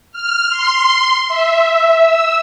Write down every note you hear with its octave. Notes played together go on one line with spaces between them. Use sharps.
F6
C6
E5
E6